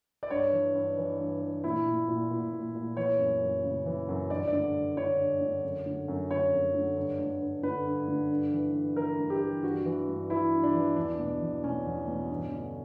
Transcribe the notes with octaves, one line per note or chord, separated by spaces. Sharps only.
D5
G2 C#5
E3
G2
E3
G2
E3
A#2 E4
A#2
A#2
A#2
A#2
A#2
E3 C#5
F#2
F#2
C#3
E3
F#2
G2 D5
D3 D5
G2
D3 C#5
G2
D3
F#2
D3
F#2
D3 C#5
F#2
D3
G2
D3
G2
D3 B4
G2
D3
G2
E3
G2
E3 A#4
G2
G4
E3
G2 F#4
E3
G2
E3 E4
G2
D4
E3
E2 D4
B2
E2
B2 C#4
E2
B2
G2
D3